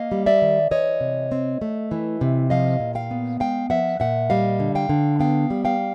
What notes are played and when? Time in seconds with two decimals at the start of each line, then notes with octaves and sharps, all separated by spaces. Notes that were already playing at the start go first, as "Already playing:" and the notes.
Already playing: A#3 D#5 F5
0.12 G3
0.26 D5 E5
0.42 D#3
0.71 E3 C#5 D#5
1.01 C3
1.32 C4
1.62 A3
1.91 E3
2.21 C3
2.50 F3 D#5 F5
2.80 A#2
2.95 F5 G5
3.11 B3
3.40 G#3 F5 G5
3.70 F3 E5 F#5
4.00 A#2 E5 F#5
4.30 G3 D#5 F5
4.60 D3
4.75 F5 G5
4.89 D3
5.19 B3 F5 G5
5.50 G3
5.65 F5 G5